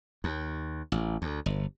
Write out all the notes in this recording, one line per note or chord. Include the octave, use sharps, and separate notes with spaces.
D#2
A1
D2
G1